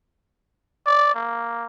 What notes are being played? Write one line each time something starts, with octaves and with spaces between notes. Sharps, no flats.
D5
A#3